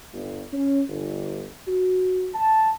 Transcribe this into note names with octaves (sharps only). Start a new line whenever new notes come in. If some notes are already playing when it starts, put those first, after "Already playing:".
G1
C#4
G1
F#4
A5